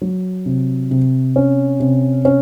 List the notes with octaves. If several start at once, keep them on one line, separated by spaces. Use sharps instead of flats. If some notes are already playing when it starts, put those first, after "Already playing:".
F#3
C3
C3
C#4
C3
C#4